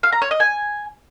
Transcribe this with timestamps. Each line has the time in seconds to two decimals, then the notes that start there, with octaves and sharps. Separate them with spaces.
0.03 F5
0.12 A#5
0.22 C#5
0.31 D#5
0.40 G#5